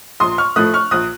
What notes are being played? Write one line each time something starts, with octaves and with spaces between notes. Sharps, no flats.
A#1 C6 D#6
C#6 F6
A2 F3 A3 D#6 F#6
C#6 F6
A#1 D#6 F#6